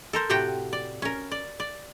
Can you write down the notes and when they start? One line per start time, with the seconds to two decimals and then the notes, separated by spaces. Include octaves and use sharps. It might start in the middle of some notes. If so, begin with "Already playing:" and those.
0.13 A4 A#4 C5
0.30 A2 C3 F#4 G4 F#5 G5
0.73 D5
1.02 C#4 A#4
1.31 D5
1.60 D5